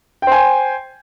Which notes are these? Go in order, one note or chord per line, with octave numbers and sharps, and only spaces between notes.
C5 G5 G#5